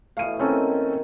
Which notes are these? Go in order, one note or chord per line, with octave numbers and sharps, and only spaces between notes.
B2 E3 A3 F5 D#7
D#3 A#3 C4 C#4 A4